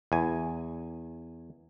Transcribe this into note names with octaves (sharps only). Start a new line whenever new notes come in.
E2 G#5